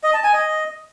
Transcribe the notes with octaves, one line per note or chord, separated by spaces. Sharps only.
D#5
A5
G#5
D#5